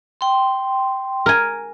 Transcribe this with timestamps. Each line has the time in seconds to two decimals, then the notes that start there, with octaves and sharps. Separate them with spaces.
0.21 G5 C6
1.26 A#4 G#5